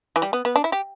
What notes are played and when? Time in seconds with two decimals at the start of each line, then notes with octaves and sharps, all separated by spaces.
0.16 E3
0.22 G3
0.33 B3
0.45 B3
0.56 D4
0.64 E4
0.72 G4